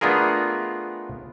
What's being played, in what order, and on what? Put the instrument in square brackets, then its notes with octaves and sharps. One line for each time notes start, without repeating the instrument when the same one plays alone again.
[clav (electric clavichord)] A3 B3 D4 F4 G#4 A#4